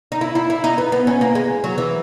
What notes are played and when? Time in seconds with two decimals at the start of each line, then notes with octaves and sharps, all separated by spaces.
0.12 D#4
0.21 E4
0.35 E4
0.50 E4
0.64 D#4
0.78 B3
0.92 B3
1.07 C#4
1.21 A#3
1.35 G#3
1.64 F#3
1.78 E3